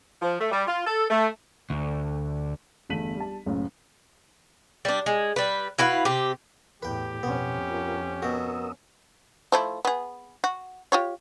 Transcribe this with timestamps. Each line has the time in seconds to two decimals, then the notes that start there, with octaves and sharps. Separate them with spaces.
0.21 F3
0.40 A3
0.52 G3
0.67 F4
0.85 A4
1.10 A3
1.70 D2
2.90 G1 E2 A3 B6 D#7 F#7
3.16 G3 A5
3.46 F#1 C#2 F#2 A2
4.85 G3 D4
5.06 G#3
5.36 G3 B4
5.78 E4 F#4 B4 F5
6.05 C3 G4
6.83 E2 A2 G4 B4 G5
7.23 F2 B2 B3 C#4
7.69 F4 A#4
8.22 B2 F#4 A#4 D#6 E6
9.52 F3 A3 E4
9.85 B3 G#4
10.44 F#4
10.92 F4 G4 C#5